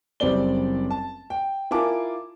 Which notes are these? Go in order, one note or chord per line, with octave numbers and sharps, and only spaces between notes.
F#1 G3 C4 C5 D5 G7
A5
G5
E4 F4 A#4 G#5 A5 D6